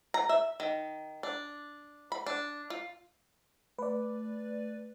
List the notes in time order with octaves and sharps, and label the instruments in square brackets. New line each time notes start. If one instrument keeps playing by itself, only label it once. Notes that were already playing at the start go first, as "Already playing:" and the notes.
[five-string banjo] A#5
E5
D#3
D4
B5
D4
F4
[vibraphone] A3 [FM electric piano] B4 D5